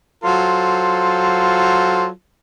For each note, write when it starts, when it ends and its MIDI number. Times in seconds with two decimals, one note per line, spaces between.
0.23 2.08 54
0.23 2.08 65
0.23 2.08 69
0.23 2.08 72